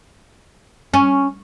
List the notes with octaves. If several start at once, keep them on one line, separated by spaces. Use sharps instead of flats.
C#4